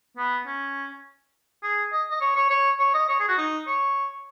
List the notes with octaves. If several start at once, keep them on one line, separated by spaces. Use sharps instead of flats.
B3
C#4
G#4
D#5
D#5
C#5
C#5
C#5
C#5
D#5
C#5
G#4
F#4
D#4
C#5